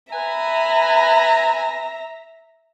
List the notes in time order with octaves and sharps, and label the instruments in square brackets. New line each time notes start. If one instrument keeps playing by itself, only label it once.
[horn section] B4 G#5 B5 [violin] E5 A#5